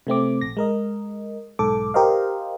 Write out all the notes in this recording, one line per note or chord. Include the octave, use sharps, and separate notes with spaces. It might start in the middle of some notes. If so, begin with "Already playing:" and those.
C3 A3 C4 D6
A#1 A#6
G#3 A#4 D#5
B1 G#2 A4 D6
G4 A#4 C5 D#5 F5